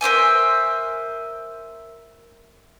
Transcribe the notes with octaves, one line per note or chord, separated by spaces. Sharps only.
A#4 C5 E5 G#5